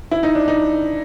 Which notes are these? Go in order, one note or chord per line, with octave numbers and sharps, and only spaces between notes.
E4
D#4
D4
D#4